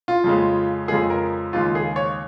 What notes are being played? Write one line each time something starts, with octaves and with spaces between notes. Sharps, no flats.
F4
F2 C#3 G#3
F2 C#3 F3 G#3 G#4
A#4
D#2 C#3 G#3 F4
G#4
C#5